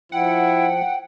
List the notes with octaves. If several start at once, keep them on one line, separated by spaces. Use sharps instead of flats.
F3 E4 F#5 G5